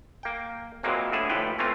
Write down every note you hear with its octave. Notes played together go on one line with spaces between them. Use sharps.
A#3 G5
A#2 E3 F#3 G#3 A#3 C4
A2 D3 E4 G#4 A5
D#2 A2 E3 F3 B4 G5
E3 A3 A#3 C4 C#4 F4